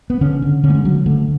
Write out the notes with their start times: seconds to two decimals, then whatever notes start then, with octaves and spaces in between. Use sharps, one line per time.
0.10 B3
0.21 D3 C#4
0.42 D3
0.64 D3 C#4
0.70 A3
0.75 G#3
0.85 D3 F#3
1.06 D3 A3